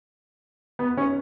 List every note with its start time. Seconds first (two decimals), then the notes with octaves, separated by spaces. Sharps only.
0.79 B3
0.97 C#4